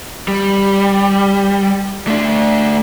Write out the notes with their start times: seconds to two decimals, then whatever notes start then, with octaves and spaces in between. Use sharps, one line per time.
0.28 G3
2.08 A3 D4